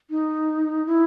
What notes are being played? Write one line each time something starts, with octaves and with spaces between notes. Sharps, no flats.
D#4
E4